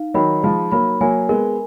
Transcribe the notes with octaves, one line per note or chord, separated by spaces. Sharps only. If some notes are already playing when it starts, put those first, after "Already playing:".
Already playing: D#4 F5
D#3 F#3 B5
F3 G#3 B5
F#3 A#3 B5
F#3 A#3 G#5
G#3 B3 A#4